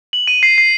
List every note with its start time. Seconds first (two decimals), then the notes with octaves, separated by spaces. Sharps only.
0.13 F#7
0.27 D#7
0.43 C7
0.58 C7